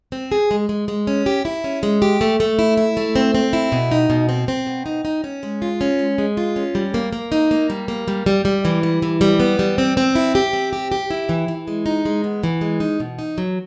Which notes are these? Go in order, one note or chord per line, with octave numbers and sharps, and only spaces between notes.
C4
G#4
G#3
G#3
G#3
C#4
G4
E4
C#4
G#3
G4
A3
A3
E4
E4
A3
C4
C4
E4
B2
D#4
B2
C4
C4
B2
D#4
D#4
C#4
G#3
F4
C#4
G#3
G#3
F4
C#4
G3
A#3
A#3
D#4
A#3
G3
A#3
G3
G3
G3
E3
G3
E3
G3
B3
G3
C4
C4
E4
G4
C4
G4
G4
E4
E3
E3
G#3
D#4
G#3
B3
E3
G#3
D#4
B2
D#4
F#3